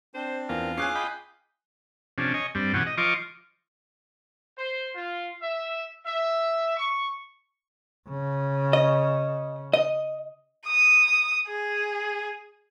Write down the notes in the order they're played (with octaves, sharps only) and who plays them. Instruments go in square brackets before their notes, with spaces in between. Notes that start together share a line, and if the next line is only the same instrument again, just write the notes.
[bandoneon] C4 D4 [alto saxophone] C5
[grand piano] E2 [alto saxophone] F4 [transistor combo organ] A#4
[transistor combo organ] C#4 [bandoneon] G#4 D6 [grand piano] G#5 F#6 C7
[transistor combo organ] D#5 G5 B5
C3 F3 C#4 D4
C#5 D#5 G#5
G2 G3 C4
B2 E3 C#4 G4 F#5
D#5
F3 F4 D#5 C#6 D6
[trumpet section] C5
F4
E5
E5
C#6
[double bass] C#3
[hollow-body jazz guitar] D#5
D#5
[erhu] D#6
G#4